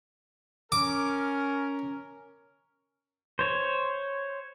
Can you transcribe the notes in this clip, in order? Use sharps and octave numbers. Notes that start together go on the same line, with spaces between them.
C#4 A#4 D6
C5 C#5